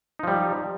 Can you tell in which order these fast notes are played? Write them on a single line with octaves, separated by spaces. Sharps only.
D#4 F3 G3